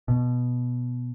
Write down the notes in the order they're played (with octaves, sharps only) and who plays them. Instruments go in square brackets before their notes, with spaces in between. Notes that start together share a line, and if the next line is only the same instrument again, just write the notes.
[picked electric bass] B2